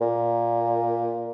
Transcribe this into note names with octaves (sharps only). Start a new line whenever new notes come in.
A#2